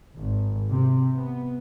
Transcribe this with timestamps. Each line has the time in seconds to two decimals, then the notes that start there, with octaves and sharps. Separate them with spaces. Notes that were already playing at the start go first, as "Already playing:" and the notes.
0.18 G#1
0.72 C3
1.16 B3